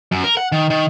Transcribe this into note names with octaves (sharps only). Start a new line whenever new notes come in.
F#2
A#4
F#5
D#3
D#3